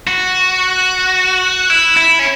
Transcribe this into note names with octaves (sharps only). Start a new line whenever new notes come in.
F#4
E4
E4
C#4